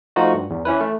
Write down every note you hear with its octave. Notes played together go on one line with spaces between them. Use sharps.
F3 A3 D#4 F4 F#4
G2
E2
E3 C#4 E4 B4
A3